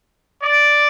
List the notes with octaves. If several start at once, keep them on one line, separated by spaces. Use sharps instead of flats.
D5